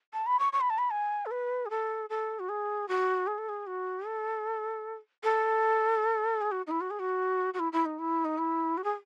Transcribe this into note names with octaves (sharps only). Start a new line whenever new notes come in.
A5
B5
C#6
C#6
B5
A5
B5
G#5
A4
B4
G#4
A4
A4
F#4
G#4
F#4
G#4
A4
G#4
F#4
A4
A4
G#4
F#4
D#4
E4
F#4
G#4
F#4
F#4
E4
E4
D#4
E4
D#4
E4
F#4
G#4